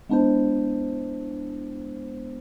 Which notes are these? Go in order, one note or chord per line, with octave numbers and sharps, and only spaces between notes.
G#3 B3 D4 E4 C5